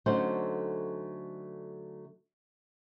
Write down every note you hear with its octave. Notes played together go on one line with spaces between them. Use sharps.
D3 F#3 A3 C#4 D#4 C5